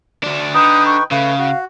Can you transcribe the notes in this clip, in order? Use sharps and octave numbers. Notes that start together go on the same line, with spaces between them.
D2 D4
D3 D#4 B4 G5 D#6
C#6
C#3 A3 B4 F5
F#4